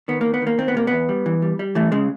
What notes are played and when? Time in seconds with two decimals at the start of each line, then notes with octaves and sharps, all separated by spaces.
0.08 D#3 B3
0.21 D#3 A#3
0.34 B3
0.42 D#3 A#3
0.58 D#3 C4
0.68 B3
0.75 C3 A#3
0.87 E2 B3
1.09 G3
1.26 E3
1.42 G3
1.59 G3
1.75 E3 A3
1.92 C#3 G#3